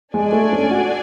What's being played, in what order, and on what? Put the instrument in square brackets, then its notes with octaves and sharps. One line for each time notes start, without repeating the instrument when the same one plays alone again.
[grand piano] G#3 [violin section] D4 A4 D5 G#5
[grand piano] A3
C#4
F#4